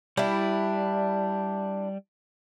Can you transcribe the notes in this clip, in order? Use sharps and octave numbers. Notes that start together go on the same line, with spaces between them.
G3 D4 E4